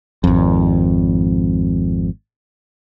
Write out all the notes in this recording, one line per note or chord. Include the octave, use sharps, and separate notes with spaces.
G#1 F2